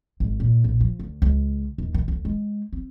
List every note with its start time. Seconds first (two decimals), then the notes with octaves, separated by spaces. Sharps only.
0.20 G#1
0.40 A#2
0.64 A#1
0.80 F3
0.99 D2
1.22 C#2
1.78 D#2
1.94 D#3
2.08 D2
2.25 G#3
2.73 C4